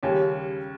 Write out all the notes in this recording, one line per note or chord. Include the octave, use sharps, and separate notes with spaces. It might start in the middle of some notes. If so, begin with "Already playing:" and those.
D#2 C#3 G3 C#4 G4